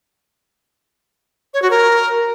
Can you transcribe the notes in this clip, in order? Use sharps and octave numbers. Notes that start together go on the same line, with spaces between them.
C#5
F#4
A#4